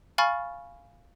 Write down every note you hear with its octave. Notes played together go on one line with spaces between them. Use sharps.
F5 G#5 B5 C#6 F6 A6